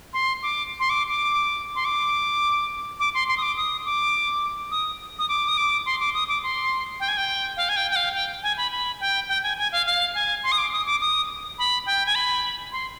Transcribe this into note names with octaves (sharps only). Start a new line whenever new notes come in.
C6
D6
C6
D6
D6
C6
D6
D6
C6
C6
D#6
D6
D#6
D6
D#6
D#6
D6
D#6
D6
C6
D6
D#6
D6
C6
G5
G#5
G5
F5
G#5
G5
G5
F5
G5
G#5
B5
B5
G5
G5
G#5
G#5
F5
F5
G#5
C6
D#6
D6
D#6
D6
D#6
B5
G5
G#5
B5
C6